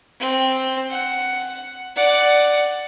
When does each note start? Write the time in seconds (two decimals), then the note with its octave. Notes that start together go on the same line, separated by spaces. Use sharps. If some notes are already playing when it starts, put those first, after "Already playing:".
0.20 C4
0.91 F#5
1.96 D5 F#5